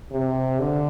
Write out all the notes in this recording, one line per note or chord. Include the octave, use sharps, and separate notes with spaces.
C3
D3